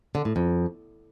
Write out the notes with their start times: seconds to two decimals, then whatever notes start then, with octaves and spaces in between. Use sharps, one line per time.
0.15 D3
0.25 A2
0.36 F2